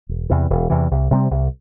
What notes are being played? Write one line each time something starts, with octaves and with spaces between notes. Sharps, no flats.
E1
E2 C3 E3
E1
E2 C3 E3
C2
C3 G3 C4
C2